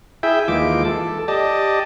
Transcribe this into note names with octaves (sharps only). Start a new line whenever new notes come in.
E4 G#4 E5 G5
D#2 E3 G#3 F4 D6
A4
G4 D5 D#5 A5